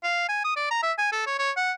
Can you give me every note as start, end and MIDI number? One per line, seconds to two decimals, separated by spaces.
0.04 0.25 77
0.29 0.44 80
0.45 0.56 87
0.56 0.68 74
0.71 0.81 82
0.83 0.93 76
0.98 1.08 80
1.12 1.24 69
1.27 1.38 73
1.39 1.51 73
1.57 1.72 78